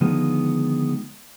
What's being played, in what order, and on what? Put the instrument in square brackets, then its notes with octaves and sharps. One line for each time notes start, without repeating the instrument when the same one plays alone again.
[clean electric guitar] D3 D#3 F3 G#3 B3